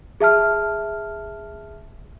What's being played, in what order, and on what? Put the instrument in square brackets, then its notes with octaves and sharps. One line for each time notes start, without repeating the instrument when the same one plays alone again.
[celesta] G#4 E5 A5 F6